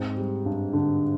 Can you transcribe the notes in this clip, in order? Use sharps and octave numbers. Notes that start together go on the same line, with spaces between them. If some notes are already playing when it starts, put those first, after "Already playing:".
Already playing: G#2 C4
G3
G2
D3